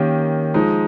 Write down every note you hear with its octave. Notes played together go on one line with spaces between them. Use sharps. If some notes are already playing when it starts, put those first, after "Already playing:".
Already playing: D#3 A#3 C#4 G4
F3 G#3 D#4